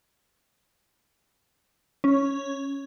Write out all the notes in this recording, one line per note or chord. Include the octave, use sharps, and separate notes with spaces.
C#4